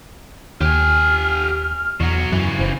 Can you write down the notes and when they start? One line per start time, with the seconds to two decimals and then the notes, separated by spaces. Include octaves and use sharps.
0.61 D#2 G4 G#5 F6
2.00 E2 B2 F#3
2.32 F#2 C#3 E3
2.59 F#1 C5